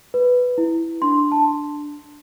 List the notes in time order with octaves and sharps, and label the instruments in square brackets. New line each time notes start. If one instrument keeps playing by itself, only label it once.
[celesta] B4
E4
D4 C6
A5